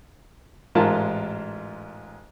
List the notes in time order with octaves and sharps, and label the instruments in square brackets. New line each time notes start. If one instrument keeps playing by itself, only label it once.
[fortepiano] A1 G#2 F4 A#4 A5